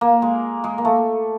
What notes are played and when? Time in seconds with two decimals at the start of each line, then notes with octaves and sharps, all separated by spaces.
0.01 A#3
0.22 G#3
0.64 G#3
0.78 A#3
0.85 A3